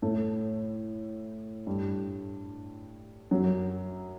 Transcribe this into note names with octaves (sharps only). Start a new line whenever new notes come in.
A2 A3
G2 G3
F#2 F#3